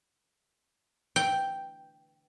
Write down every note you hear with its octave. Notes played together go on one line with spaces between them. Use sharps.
G5